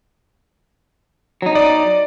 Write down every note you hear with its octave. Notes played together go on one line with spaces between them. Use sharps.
F#3 D#4
D5